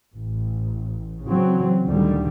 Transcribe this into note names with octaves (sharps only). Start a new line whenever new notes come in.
A1
C#3 E3 F#3 C4
D2 A#2 D3 D#3 G3